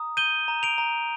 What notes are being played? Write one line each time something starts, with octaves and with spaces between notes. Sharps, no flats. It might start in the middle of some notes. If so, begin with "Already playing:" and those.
Already playing: A#5 D#6
G6 D#7 G7
A#5
D7 F7
A#5